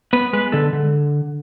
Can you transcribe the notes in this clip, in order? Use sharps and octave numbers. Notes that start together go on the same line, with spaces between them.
B3 B4
G#3 B4
D3 A4
D3